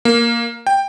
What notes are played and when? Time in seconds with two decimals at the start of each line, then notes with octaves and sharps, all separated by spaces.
0.05 A#3
0.67 G5